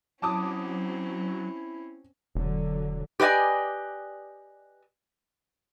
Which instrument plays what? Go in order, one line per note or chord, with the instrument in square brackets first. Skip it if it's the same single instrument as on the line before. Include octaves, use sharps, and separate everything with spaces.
[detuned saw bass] F#3 [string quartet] C4 C#4 [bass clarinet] E4 [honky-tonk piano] A5 D6 D#6
[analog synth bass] E1 [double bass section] D3 F#3
[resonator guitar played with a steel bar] G4 B4 D5 D#5 G#5